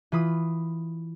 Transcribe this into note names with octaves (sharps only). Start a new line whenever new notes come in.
E3 F4 B5 D#6